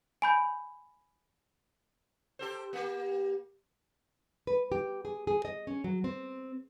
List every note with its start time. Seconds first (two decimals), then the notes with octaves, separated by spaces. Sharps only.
0.22 G#5 B5 G6
2.39 G4 A4 C5
2.73 A#3 G4
4.47 B4
4.72 G4
5.05 G#4
5.27 G#4
5.45 D#5
5.67 C#4
5.84 F#3
6.04 C4